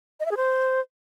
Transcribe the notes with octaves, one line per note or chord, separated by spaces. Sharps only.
D#5
E5
G#4
C5